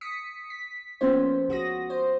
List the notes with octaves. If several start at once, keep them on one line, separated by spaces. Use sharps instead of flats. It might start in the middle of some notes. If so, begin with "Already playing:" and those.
D#6 B6 C#7
B6
F3 A#3 B3 C#4 C5
C#2 F#4 D#6 A#6
C5